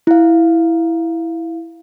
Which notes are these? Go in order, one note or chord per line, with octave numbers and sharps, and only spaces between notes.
E4 F5